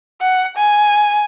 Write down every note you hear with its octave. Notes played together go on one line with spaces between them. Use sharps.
F#5
G#5